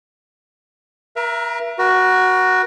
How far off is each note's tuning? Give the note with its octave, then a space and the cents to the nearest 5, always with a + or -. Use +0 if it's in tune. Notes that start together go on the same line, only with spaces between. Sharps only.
A#4 +40 E5 +30 A#5 +0
F#4 +5 A#4 +40